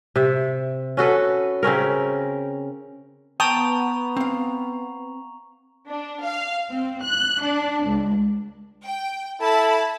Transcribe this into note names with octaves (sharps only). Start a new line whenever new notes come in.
C3 E5
C#4 F#4 A4 B4
C#3 C4 C#4 A#4
B3 G5 A5 A#5 C#6 D#6 F7
C4 F5
D4
F5
C4
F#6
D4
C#2
G5
E4 A4 A5 B5